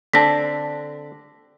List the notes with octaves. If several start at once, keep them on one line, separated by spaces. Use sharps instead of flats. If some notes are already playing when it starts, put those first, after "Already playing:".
D3 C4 D4 A5 A#6 B6